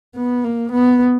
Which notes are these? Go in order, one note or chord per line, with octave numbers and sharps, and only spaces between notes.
B3
A#3
B3